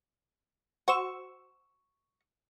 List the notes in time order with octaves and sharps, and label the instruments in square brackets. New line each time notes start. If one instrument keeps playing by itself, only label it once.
[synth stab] F#4 C5 E6 [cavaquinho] C#6